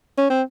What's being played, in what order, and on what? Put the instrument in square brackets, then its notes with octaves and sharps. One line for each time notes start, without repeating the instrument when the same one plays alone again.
[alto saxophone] C#4
C4